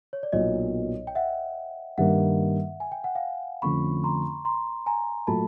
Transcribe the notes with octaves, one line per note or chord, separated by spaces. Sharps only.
C#5
D5
B1 A#2 F#3 B3 C#5 D#5
G5
E5 F#5
G2 D#3 G3 A#3 E5 F#5
G#5
G5
F#5
F5 G5
F2 D3 F3 A3 C#4 B5 C#6
A#5 C6
A#5 C6
G#5 A#5
A#2 F#3 A3 A5 B5